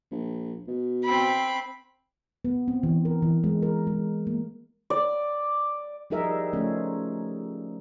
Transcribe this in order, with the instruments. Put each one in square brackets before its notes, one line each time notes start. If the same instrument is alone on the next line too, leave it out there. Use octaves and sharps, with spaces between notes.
[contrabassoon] A#1
B2
[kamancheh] C4 B5
[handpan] B3
C4
E3
A#4
E3
G#3
A#4
G#3
A#3
[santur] D5
[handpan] F3 G3 D#4 G#4 A#4 E5
C#3 F3 A3 C#4